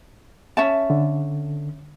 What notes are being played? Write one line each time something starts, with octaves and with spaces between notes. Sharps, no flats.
C#4 E5 A5
D3